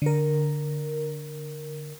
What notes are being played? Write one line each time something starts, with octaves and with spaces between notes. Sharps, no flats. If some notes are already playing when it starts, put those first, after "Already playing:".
D3 A#4